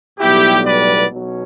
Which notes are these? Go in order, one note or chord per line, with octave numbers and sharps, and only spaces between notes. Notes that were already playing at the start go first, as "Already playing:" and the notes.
B1 A2 G3 B3 E4 G4
B4 D5
B1 B2 F#3 C#4